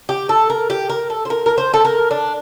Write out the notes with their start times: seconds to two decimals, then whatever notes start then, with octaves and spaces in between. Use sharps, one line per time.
0.09 G4
0.29 A4
0.50 A#4
0.70 G4
0.90 A#4
1.10 A4
1.25 C5
1.30 A#4
1.46 A#4
1.58 C5
1.74 A4
1.85 A#4
2.11 D4